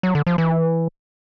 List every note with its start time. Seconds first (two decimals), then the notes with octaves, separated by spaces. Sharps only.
0.03 F#3
0.15 D3
0.27 F3
0.38 E3